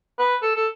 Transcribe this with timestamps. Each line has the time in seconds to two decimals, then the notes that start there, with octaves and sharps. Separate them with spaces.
0.19 B4
0.43 A4
0.56 A4